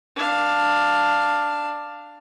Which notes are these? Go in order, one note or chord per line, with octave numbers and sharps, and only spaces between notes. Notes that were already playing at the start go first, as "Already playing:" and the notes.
D4 F5